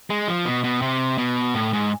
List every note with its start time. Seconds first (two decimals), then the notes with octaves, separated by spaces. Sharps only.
0.10 G#3
0.28 F3
0.45 B2
0.64 B2
0.82 C3
1.18 B2
1.55 A2
1.73 G#2